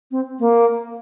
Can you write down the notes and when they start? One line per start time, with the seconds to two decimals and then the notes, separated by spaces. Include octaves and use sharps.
0.11 C4
0.40 A#3